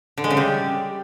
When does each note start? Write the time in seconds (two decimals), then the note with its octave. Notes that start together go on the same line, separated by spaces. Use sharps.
0.18 D3
0.24 G#3
0.30 C#3
0.37 G3